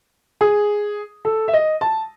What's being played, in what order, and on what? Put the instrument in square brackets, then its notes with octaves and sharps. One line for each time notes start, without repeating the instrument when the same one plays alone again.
[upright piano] G#4
A4
E5
D#5
A5